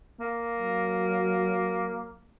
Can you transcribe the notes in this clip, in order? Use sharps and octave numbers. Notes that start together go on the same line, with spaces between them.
A#3
F#3